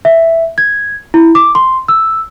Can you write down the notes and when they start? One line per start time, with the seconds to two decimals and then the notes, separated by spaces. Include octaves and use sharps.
0.05 E5
0.58 G#6
1.14 E4
1.35 D6
1.55 C6
1.88 E6